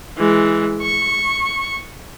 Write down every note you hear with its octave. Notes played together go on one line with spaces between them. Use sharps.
E3 G#3
C#6